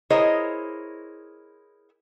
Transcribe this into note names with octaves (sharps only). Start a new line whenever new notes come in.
E4 G#4 A#4 C5 C#5 D#5